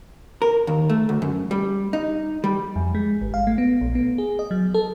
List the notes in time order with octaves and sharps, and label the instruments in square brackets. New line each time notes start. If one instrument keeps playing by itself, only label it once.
[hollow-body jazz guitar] A#4
D#2
A3
D2
F#2
G3
D#4
G3
[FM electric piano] F2
G#3
G#1
F5
A3
B3
A#1
B3
G#4
D#5
F#3
A4